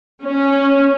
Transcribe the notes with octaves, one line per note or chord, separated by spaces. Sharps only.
C#4